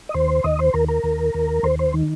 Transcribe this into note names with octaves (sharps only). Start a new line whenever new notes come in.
D#5
D#2 C5
D#2 D#5
C5
D#2 A#4
A#4
D#2
D#2
D#2 C5
C5
D#3